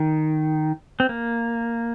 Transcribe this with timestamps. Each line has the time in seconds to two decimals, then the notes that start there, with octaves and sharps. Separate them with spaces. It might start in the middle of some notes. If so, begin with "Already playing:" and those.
Already playing: D#3
1.00 C4
1.09 A#3